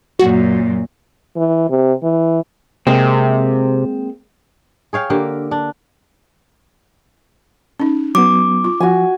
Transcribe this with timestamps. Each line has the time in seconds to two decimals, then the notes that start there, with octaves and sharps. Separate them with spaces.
0.19 F#2 A#2 F#4
1.36 E3
1.70 C3
2.03 E3
2.87 C3 G#3 A#3 C4
4.93 G#4 C#5 F5 G5
5.10 D3 A#3 G4
5.51 D4
7.80 C#4 D#4
8.15 F#3 B3 D6
8.64 F4
8.80 F3 F#4 G#5